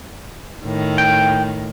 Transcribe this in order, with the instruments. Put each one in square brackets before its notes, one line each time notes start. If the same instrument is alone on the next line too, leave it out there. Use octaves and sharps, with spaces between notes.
[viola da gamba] A2 D#3
[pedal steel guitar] G5